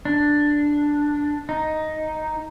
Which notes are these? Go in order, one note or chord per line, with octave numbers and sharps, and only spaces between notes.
D4
D#4